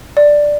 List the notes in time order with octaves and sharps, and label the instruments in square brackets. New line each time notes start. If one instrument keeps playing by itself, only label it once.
[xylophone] D5